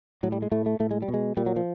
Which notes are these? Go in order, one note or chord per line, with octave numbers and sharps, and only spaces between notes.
A2 F#3
G3
G#3
A2 A3
A3
A2 A3
G#3
G3
B2
G#3
A#2 G3
F#3
F3